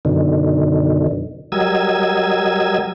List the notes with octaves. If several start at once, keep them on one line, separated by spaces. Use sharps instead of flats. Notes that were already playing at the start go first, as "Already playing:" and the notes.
F#2 B2 D3 D#3
F#3 G3 A#4 D#5 E6 G#6